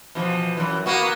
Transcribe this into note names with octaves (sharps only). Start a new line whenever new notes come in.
B2 E3 F3
F#2 E3
A#3 B3 F#4